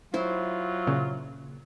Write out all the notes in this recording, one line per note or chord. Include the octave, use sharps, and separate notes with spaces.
F#3 E4 F4 C5
A#2 C#3